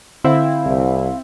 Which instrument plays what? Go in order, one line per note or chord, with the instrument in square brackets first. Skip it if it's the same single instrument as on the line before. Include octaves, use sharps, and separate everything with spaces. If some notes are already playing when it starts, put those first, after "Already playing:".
[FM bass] D3 [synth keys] C4 E4 [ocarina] F5
[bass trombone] C2